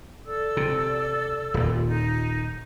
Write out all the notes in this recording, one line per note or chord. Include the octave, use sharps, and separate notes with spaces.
A4 D5 E6
C3
D#1 A#2
D#4